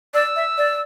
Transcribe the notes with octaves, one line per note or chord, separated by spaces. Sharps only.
D5 E6
E5
D5